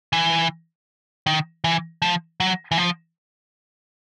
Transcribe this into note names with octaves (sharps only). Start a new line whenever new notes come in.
E3
D#3
E3
F3
F#3
E3
F3